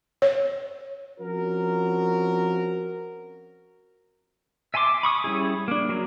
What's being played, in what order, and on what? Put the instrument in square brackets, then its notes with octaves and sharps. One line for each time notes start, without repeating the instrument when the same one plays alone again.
[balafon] C#5
[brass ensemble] F3 C4 C#4 F#4 A#4
[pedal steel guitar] E5 G#5 A5 C6 D6
B5 C#6 D#6
G3 C#4 E4 G#4
A#3 D4
F#3 A#3